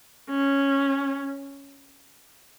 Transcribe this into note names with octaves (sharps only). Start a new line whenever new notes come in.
C#4